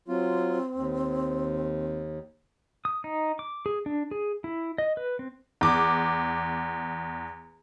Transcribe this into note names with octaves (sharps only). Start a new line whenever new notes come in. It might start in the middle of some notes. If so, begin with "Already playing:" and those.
F#3 C4 F4
D#2
D#6
D#4
D6
G#4
D4
G#4
E4
D#5
B4
C4
E2 D6